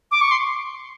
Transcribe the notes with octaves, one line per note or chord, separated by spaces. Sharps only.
D6
C#6
C6